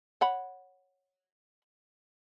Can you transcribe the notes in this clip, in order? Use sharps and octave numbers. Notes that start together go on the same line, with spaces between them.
C#5 F#5 B5